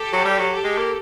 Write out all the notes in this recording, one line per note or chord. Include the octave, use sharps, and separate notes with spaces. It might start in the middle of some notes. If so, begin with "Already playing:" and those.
Already playing: G4 A4
F#3
G3
F#3
G4 A4
G#3
A#3